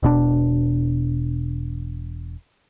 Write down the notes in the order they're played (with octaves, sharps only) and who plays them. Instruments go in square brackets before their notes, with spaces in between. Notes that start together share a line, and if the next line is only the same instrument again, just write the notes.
[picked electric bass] E1 B2 D4